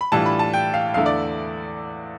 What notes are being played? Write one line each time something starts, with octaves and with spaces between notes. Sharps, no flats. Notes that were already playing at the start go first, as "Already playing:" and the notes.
B5
A2 E3 G3 D4 F4 A5
B5
A5
G5
F5
E2 D3 A3 E4 F5
D5